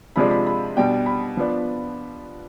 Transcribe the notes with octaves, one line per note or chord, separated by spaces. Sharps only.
C3 F3 G#3 D4 B5
B5
B5
B2 G3 D4 G5
G5
B5
F3 B3 D4